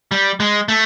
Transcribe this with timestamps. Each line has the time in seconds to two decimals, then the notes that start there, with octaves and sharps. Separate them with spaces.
0.12 G3
0.40 G#3
0.68 A3